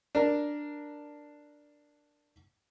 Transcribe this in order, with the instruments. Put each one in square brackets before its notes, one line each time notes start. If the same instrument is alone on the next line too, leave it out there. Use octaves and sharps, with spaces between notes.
[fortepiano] D4 A#4